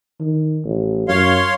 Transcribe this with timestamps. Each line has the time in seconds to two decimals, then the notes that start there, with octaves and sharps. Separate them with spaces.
0.21 D#3
0.64 A1
1.08 F#2 C#5 F5 C6